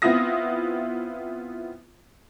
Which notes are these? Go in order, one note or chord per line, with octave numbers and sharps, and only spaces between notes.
B3 C4 E4 F4 D#6 A#6